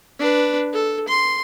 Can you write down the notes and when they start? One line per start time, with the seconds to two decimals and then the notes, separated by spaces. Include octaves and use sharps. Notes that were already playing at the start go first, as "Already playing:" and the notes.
0.19 D4 B4
0.74 A4
1.08 C6